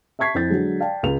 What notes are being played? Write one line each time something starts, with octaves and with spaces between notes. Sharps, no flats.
E5 A5 C#6 G#6 B6 C7
F2 E4 G6 A6
D3 F#3 G#3
D5 F5 G5 A5
C#2 G#3 F7